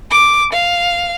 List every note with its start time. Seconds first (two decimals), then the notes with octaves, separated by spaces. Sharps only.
0.11 D6
0.52 F5